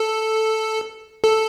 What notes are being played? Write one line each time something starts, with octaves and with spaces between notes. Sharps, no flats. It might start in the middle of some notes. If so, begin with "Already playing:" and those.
Already playing: A4
A4